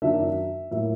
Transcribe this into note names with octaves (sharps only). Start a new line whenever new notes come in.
F#2 D#3 F#3 A#3 D4 E5
A2 F#3 A#3 E5